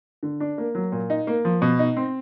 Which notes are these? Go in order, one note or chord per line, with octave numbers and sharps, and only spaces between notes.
D3
D4
A#3
F#3
A#2
D#4
A#3
F3
B2
D#4
C4